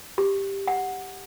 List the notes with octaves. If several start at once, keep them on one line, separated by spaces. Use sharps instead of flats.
G4
F#5